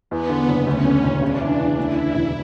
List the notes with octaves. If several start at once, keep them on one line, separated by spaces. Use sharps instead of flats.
E2 B3
D3
F#1
D2 C#4
D3
E1
C#3 D4
E3
E2
D2 E4
D3
E1